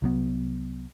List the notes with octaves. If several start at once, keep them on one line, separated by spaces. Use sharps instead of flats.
C2 F#3 B3